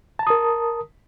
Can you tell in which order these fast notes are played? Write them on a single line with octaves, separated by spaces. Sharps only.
A5 A#5 D#6 A#4